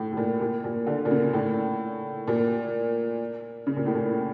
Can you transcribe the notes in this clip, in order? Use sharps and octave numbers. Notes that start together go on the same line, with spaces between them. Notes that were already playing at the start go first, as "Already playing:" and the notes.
Already playing: A2
A2
A#2
A#2
A#2
D3
A#2
C#3
A2
A#2
C#3
A#2
A2
A#2